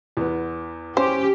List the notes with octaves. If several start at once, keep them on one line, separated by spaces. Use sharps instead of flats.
E2 B3
C#4 G4 C5